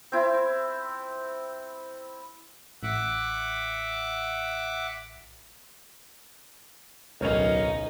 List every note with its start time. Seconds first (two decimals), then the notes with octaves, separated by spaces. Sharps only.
0.12 C4 E4
2.83 A1 E5 F#5 D6
7.21 D1 B1 A#3 C#4 D#4 F7